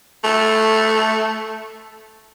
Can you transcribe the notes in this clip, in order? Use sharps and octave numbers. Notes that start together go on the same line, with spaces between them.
A3